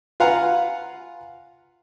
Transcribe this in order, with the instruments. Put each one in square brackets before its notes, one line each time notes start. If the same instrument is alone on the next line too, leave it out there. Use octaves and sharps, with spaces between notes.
[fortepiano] F4 B4 F5 F#5 G#5 A#5